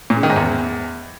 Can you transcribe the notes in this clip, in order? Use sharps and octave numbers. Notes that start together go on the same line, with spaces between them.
A#2
C#3
D#3
G#2
E2